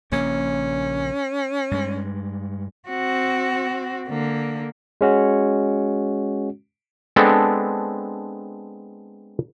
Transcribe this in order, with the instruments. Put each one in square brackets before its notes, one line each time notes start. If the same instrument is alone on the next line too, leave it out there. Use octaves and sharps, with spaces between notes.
[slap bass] A#1 C#3 A#3 [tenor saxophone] C#4
[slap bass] G2 G#3
[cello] C4 F#4
D3 A#3
[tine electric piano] G#3 C#4 F#4
[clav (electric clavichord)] G#3 B3 C4 D4 A4